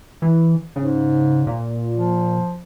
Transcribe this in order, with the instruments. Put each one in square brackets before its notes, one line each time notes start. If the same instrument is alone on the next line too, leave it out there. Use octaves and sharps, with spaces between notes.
[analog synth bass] E3
[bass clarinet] G#2 [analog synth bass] C#3
[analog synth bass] A#2
[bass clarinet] F3